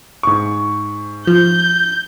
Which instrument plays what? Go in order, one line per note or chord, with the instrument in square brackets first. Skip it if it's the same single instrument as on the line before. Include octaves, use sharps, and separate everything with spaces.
[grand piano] G#2 C#6
[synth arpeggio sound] F3 [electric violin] G6